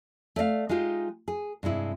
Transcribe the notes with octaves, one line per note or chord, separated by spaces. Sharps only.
A3 D5 D#5 F5
G#3 D#4 F4 G4
G#4
G2 C3 G#3 E4